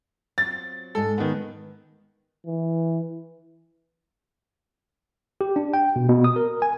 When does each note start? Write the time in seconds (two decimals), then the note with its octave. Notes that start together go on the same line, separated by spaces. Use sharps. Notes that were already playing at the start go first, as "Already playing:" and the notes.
0.38 F#3 C4 F4 A6
0.95 G#2 G#3 A4 D#5
1.18 D#3 B3
2.46 E3
5.41 G4
5.56 D4
5.74 G5
5.96 B2
6.09 B2
6.24 D#6
6.36 A#4
6.62 G#5